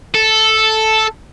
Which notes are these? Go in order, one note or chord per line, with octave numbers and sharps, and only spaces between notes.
A4